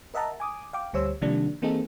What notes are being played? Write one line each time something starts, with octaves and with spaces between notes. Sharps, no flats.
A#4 D#5 E5 F#5 A5 A#5
G#5 D6 D#6
F5 G5 D6
D2 G3 C5 C#5 E6
C3 D#3 F3 G3 A#3 D4
E3 A#3 C4 D#4 G#4 A4